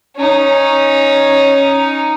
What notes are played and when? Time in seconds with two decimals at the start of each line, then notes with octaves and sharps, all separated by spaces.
0.16 C#4 D#4